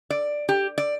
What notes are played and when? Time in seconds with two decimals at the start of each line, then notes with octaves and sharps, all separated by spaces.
0.10 D5
0.49 G4
0.78 D5